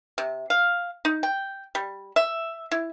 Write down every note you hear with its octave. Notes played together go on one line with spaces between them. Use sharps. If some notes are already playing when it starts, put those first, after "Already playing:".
C3
F5
D#4
G5
G3
E5
E4